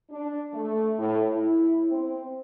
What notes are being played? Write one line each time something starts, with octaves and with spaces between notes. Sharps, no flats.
D4
A3
A2
E4
C4